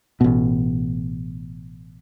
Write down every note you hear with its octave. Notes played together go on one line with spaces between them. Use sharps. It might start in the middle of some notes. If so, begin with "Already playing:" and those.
A1 B2